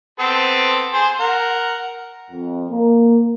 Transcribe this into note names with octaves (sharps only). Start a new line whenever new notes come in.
B3 C4 A4
G#4 C5
A#4 F#5
F2
A#3